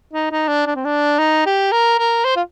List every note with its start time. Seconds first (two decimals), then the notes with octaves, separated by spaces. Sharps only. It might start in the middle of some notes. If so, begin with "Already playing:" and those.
0.13 D#4
0.31 D#4
0.48 D4
0.66 D4
0.75 C4
0.85 D4
1.19 D#4
1.46 G4
1.72 A#4
1.99 A#4
2.24 C5
2.36 F4